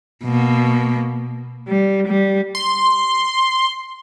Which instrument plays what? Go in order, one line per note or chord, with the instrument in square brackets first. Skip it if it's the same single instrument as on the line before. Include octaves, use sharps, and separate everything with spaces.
[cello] B2 A#3
G3
G3
[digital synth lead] C6